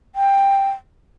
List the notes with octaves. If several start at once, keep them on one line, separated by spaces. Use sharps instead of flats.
G5